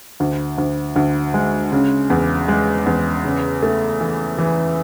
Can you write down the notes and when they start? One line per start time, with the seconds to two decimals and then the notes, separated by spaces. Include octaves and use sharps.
0.20 D2
0.58 D2
0.96 D2
1.34 G#3
1.72 C#3
2.10 E2
2.48 G#3
2.86 E2
3.24 C#3
3.62 A3
4.00 E3
4.38 E3